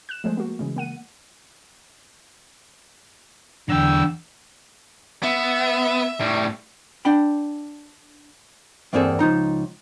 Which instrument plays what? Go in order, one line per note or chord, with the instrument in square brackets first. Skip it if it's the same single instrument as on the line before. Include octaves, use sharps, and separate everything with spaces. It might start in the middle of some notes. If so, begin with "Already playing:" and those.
[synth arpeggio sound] F#6 E7
F3 G#3 A3 C5
A#3 F#4
C#3 E3 G#3
A#3 F#5 D#7
[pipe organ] E2 D3 E6 [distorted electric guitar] F#3 G5
[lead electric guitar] B3 [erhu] E5
[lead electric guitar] A2 G3
[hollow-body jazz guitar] D4 F#5 G5 B5
E2 G2 A#3 C4 G#4 A4
C#2 F3 D#4 A#5